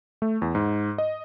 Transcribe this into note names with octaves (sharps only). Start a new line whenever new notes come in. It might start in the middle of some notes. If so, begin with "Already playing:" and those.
A3
E2
G#2
D#5